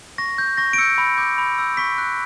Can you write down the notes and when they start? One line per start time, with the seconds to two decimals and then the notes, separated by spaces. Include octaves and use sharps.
0.18 C#6 A#6
0.38 G6
0.57 C#6 A#6
0.73 D7
0.78 E6 G6 C#7
0.98 B5
1.18 D6 G6
1.38 B5
1.58 E6 G6
1.77 C#6 B6
1.98 F#6